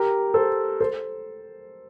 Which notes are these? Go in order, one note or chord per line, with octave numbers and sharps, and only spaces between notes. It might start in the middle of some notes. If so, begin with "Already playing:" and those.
Already playing: G4 A#4
A4 C5
A4 C5